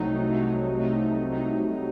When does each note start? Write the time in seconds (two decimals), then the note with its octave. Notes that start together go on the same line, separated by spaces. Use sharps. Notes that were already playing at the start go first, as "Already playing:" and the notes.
Already playing: C2 C3 F#3 A3 D#4
0.29 C2 C3 F#3 A3 D#4
0.78 C2 C3 F#3 A3 D#4
1.27 C2 C3 F#3 A3 D#4